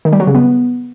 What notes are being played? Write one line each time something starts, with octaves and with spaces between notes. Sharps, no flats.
D#3
G3
F#3
C#3
B3